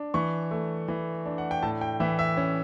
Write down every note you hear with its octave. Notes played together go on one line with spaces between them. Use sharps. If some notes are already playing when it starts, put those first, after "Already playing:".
Already playing: D4
E3 C#6
A3
E3
D4
F#5
G5
A2 A5
G5
E3 E5
E5
C#4